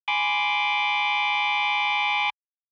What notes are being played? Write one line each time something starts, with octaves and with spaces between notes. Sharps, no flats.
G#5 B5 C6 D6